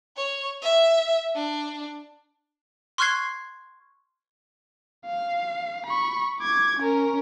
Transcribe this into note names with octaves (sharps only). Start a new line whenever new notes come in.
C#5
E5
D4
C6 C#6 F6 F#6 G#6 C7
F5
B5 C#6
D6 G#6
C#4 A#4